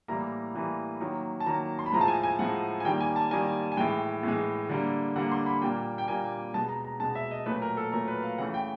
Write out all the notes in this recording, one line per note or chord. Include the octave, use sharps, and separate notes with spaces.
A2 E3 G3 A#3 A#5
A2 E3 G3 A#3
D#3 F#3 A#3
A5
D#3 F#3 A#3 A#5
C6
B5
A2 F3 G#3 A#5
A5
G#5
G#5
A2 F3 G#3 F#5
G#5
D#3 G3 A#3 G5
G#5
A5
D#3 G3 A#3 G#5
G#5
A2 E3 G#3 G5
A2 E3 G#3
D3 G3 A#3
D3 G3 A#3 F#5
C6
B5
A#2 G3 A#3 G5
G5
A#2 G3 A#3 G#5
B2 G#3 A5
A#5
A#5
B2 G#3 A5
E5
D#5
A#2 F#3 A3 B4
A#4
A4
A#2 F#3 A3 A#4
B4
F5
C#3 E3 A3 F#5
G5